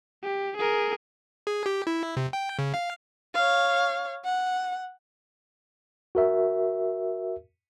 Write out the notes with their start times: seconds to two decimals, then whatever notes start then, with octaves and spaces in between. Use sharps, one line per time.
0.23 G4
0.57 G#4 A#4
1.47 G#4
1.66 G4
1.87 E4
2.17 C3
2.33 G5
2.59 C#3
2.74 F5
3.34 C#5 F5
4.25 F#5
6.15 F#4 A#4 E5